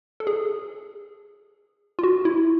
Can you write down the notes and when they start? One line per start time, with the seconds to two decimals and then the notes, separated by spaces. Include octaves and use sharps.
0.20 A4
0.27 G#4
1.99 F4
2.03 F#4
2.25 E4